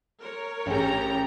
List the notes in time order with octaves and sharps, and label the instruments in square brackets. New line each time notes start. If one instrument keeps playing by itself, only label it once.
[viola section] A#4 C#5
[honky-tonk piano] A1 G#4 [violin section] G4 A#5